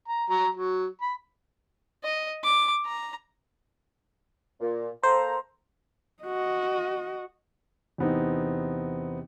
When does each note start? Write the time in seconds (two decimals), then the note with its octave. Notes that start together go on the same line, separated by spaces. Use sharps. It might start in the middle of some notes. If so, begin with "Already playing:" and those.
0.08 A#5
0.30 F#3 A#5
0.55 F#3
1.02 B5
2.04 D#5
2.44 D6
2.86 A#5
4.61 A#2
5.03 A#3 A4 C5 A#5
6.23 F#4 D#5
7.98 E2 C3 B3 C4 D#4